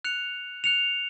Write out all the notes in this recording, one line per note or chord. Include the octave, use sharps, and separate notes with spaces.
F#6 C#7 F7
F#6 C#7 F7